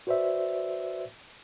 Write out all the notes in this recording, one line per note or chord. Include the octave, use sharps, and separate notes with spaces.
F#4 B4 C5 D5 E5